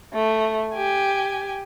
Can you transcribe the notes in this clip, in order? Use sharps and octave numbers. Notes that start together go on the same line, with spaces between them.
A3
G4 G#5